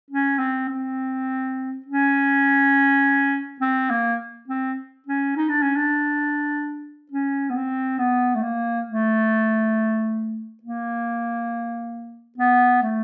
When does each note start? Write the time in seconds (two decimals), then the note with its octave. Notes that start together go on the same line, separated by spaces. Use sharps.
0.10 C#4
0.39 C4
0.69 C4
1.86 C#4
3.60 C4
3.90 A#3
4.48 C4
5.06 C#4
5.36 D#4
5.49 D4
5.62 C#4
5.76 D4
7.11 C#4
7.50 B3
7.56 C4
7.99 B3
8.36 A3
8.42 A#3
8.87 A3
10.63 A#3
12.38 B3
12.82 A3